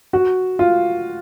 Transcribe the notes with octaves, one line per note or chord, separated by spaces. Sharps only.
F#4
F4